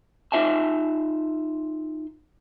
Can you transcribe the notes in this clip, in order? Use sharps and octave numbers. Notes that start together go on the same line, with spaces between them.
D#4 F4 E5 G#5 A5